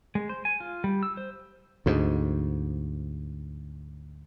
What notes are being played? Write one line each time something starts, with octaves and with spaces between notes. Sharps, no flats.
G#3
C5
G#5
F4
G3
E6
C5
D2 G#2